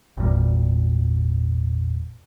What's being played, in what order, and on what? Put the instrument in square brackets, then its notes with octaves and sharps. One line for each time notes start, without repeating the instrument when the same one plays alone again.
[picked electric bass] G#1 E2 A#2 G3